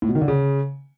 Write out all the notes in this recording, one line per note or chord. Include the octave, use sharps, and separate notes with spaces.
A2
B2
D#3
D3
C#3